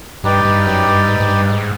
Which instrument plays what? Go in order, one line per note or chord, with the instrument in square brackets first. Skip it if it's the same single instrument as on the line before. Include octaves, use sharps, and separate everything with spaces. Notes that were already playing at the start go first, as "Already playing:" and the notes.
[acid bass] G2 [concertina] D#4 G4 B4 D5 G5
[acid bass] G2
F#2
G2
G#2
G#2
G2
G#2